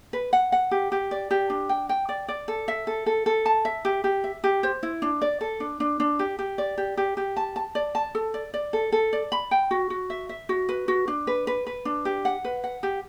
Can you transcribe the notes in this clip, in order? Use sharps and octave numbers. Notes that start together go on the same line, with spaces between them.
B4
F#5
F#5
G4
G4
D5
G4
D4
G5
G5
D5
D5
A4
E5
A4
A4
A4
A5
E5
G4
G4
E5
G4
C5
E4
D4
D5
A4
D4
D4
D4
G4
G4
D5
G4
G4
G4
A5
A5
D5
A5
A4
D5
D5
A4
A4
D5
B5
G5
F#4
F#4
E5
E5
F#4
B4
F#4
D4
B4
B4
B4
D4
G4
F#5
B4
F#5
G4